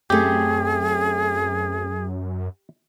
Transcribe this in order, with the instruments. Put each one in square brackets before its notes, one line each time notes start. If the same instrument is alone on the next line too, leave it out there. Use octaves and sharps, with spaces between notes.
[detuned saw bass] F#2 [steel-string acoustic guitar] A3 C4 [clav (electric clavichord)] G4 [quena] G#4